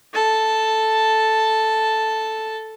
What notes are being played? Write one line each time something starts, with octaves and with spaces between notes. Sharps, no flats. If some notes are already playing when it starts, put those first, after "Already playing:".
A4 A5